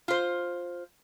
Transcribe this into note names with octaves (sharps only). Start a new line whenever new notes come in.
F4 C5